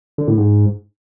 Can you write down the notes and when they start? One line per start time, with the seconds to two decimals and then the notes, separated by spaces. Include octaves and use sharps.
0.18 D3
0.28 A2
0.37 G#2